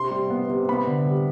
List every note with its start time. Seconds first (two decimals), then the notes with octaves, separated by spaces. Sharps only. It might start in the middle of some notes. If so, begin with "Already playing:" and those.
Already playing: C3 C6
0.11 G3
0.30 B3
0.49 C3
0.69 B3 B5
0.87 D3
1.07 G3